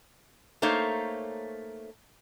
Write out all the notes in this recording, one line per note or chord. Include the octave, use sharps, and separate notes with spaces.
A3 A#3 D#4 C5 C#5 F5